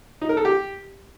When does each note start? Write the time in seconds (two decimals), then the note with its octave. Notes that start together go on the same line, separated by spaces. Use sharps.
0.21 D#4
0.29 A#4
0.37 A4
0.45 G4